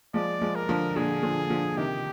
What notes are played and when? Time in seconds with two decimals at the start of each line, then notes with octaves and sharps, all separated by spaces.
0.14 F3 G#3 D5
0.41 F3 G#3
0.55 A#4
0.69 D3 F3
0.96 A#2 D3 G#4
1.23 D3 F3
1.50 D3 F3
1.77 C3 D#3 G4